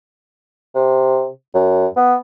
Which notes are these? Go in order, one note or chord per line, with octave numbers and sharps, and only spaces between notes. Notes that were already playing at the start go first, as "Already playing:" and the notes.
C3
F#2
B3